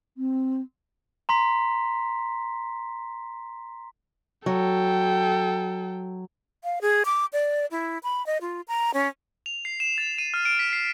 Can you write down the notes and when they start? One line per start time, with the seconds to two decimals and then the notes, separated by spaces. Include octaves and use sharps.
0.17 C4
1.29 A#5 C6 B6
4.46 F#3 A4 G5
6.64 F5
6.81 G#4
7.05 D6
7.33 D5
7.71 E4
8.03 B5
8.26 D#5
8.41 F4
8.68 A#5
8.94 C#4
9.46 F7
9.65 C7
9.80 E7
9.98 A6
10.18 D#7
10.34 F6
10.45 D7
10.59 B6
10.73 C7